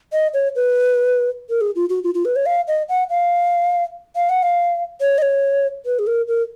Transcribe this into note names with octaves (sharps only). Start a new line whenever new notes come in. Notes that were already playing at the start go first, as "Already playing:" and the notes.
D#5
C#5
B4
A#4
G#4
F4
F#4
F4
F4
B4
C#5
F5
D#5
F#5
F5
F5
F#5
F5
C#5
D#5
C#5
B4
G#4
A#4
A#4